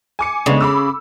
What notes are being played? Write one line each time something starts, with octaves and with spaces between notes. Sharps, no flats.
G#5 D6 C#7
C#3 G#3 B3 D4
B5 D6 E6